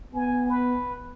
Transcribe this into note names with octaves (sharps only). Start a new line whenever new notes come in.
B3 G#5
B4